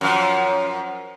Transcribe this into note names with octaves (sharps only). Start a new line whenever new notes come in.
F#2 F3